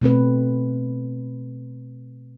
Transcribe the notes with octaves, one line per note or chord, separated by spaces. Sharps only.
B2 A3 C4 B4